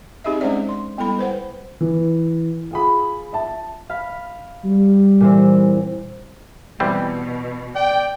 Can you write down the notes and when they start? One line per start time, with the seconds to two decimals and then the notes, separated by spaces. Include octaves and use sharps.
0.24 C4 D#4 G4 G#4 D#5 E5
0.40 G#3 C#4 D4 C5 D5 E5
0.69 C6
0.97 G3 B3 E4 A4 B5
1.19 B4 C5 F#5
1.81 E3
2.71 F4 G#4 B5
3.33 E5 A5
3.90 F5 B5
4.65 G3
5.20 A#2 E3 C4
6.80 B2 E3 G3 C4
7.75 D5 G5